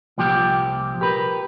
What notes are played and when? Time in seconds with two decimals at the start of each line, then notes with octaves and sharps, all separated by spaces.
0.18 C2 A#2 F3 G4
1.01 G4 A#4 B4